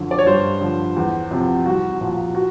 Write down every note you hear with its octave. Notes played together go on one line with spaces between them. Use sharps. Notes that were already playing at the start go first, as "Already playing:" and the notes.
Already playing: F#2 D3 F3
D5
C#5
G2 C5
D3 F3
E2
C3 F3
C2 F#4
A#2 F3
F#4